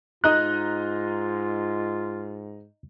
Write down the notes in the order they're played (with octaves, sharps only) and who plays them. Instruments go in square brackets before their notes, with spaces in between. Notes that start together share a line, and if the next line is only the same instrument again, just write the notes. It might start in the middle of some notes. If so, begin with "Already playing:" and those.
[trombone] G#2 [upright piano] D#4 D#5 A#5 [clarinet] F4 [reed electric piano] F#6